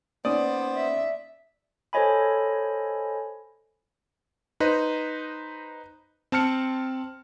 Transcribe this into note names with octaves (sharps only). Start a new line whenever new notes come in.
A#3 B3 C#4 D#4 C5 D5 D#6
E5
A4 C5 C#5 D#5 G#5 B5
D#4 B4 C5 D#5
C4 A5 F6 C#7